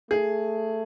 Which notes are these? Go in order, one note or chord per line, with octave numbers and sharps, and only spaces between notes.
A3 G#4